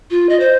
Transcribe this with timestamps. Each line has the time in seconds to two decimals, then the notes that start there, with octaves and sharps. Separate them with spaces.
0.10 F4
0.29 D#5
0.39 C5